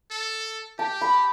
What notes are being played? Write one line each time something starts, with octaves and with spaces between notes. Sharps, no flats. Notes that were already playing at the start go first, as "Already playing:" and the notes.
A4
G4 A5
B5